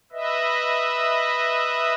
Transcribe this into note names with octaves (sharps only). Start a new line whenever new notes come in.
B4 D#5 E5